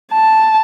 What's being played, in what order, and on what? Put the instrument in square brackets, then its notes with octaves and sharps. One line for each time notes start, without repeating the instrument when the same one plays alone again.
[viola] A5